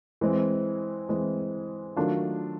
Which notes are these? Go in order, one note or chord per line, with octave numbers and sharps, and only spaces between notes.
E3 G#3 C4
E3 G#3 C4
D#3 F#3 A3 D4 F4